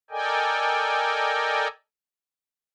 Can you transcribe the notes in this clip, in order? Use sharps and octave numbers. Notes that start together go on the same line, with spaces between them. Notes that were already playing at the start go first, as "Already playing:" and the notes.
A4 A#4 D5 D#5 G5 G#5